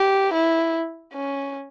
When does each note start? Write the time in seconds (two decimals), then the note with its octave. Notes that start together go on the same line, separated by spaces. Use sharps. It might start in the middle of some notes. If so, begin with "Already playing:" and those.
Already playing: G4
0.33 E4
1.13 C#4